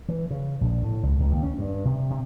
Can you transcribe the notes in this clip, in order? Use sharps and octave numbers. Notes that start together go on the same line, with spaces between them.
E3
C#3
A#1
A2
C#2
C#2
D#2
C#4
G2
C3
C3